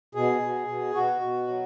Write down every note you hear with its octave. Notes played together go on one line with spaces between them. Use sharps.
B2 G#4
B2
B2
B2 F#4
B2
F#3